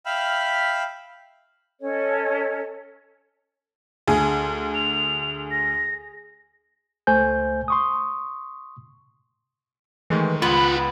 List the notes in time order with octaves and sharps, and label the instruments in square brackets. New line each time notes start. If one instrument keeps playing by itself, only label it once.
[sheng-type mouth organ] E5 F5 G5 B5 F6
[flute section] C#4 A4 C#5 D#5
[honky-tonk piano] D2 [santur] G#4
[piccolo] F7
A#6
[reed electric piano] C#2 A3 C5 G#5 G6
C6 C#6 D#6
[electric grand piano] D#3 G#3 A3 [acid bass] E3
[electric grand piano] C#2 [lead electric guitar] G#3 B4 [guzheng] B3 [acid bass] F4